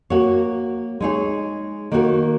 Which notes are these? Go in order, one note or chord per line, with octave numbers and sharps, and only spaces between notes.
A#3 F#4 C#5
G#3 D#4 G#4 C#5
D#3 A#3 F#4 A#4 C#5